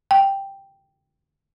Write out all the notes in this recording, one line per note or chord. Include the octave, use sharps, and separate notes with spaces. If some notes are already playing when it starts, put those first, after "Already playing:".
G5